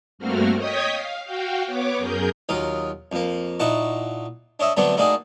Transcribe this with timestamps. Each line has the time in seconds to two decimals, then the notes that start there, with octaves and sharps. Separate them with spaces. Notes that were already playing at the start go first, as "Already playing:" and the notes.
0.19 G2 A3 A#3 C4 F#4 F6
0.56 C#5 D#5 G5 D#6 G#6 B6
0.92 F5
1.25 F#4 F5 G5
1.67 B3 C#5 D6
1.98 F#2 G#4 A#4 G6
2.49 D#2 F#3 F4 A#4 D#6
3.12 F2 A#3
3.60 A#2 D#4 E4 F#5 A5 C#6
4.60 D4 C#5 D#5 E5
4.77 D3 F#3 A3 B3 C4 D4
4.97 A3 A#3 D4 D#4 F#4 G#4